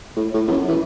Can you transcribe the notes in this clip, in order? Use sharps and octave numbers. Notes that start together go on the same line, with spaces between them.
A2
A2
E2
F#2
E3